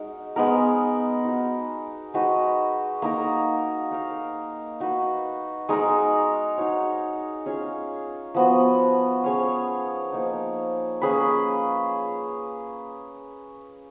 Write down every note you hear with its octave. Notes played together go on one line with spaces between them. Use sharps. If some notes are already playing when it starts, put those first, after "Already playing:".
Already playing: G#3 D#4 F#4 A#4
G#3 B3 D#4 A#4
D#4 F#4 A#4
G#3 D#4 F#4 B4
A#3 D#4 A#4
D#4 A#4 F5
D#4 F#4 B4
G#3 D#4 A#4
D#4 F#4 C#5
C#4 F4 G#4 C#5
F3 B3 F#4
C#4 G#4 C#5 F5
F3 A#3 D#4
A#3 C#4 G#4 B4